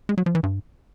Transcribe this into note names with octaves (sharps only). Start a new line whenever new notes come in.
G#3
F#3
F3
E3
G2